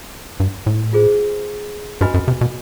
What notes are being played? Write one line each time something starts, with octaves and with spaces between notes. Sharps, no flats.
G2
A2
F4 G#4 C5
G2 F#4 B4 D#5 G#5 B5
F#2
C3
B2